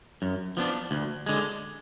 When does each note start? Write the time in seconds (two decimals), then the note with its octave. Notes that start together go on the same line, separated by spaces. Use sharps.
0.22 F#2
0.57 F3 B3 D4
0.91 D2
1.26 D3 G#3